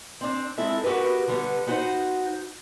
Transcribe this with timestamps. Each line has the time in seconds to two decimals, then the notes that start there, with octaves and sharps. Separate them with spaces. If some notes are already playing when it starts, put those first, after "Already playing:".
0.21 C4 D4
0.58 G#3 C4 E4 A4 E5
0.84 B3 F#4 G4 A#4 B4
1.28 D3 G3 B3
1.67 B3 D#4 F#4 C5 F#5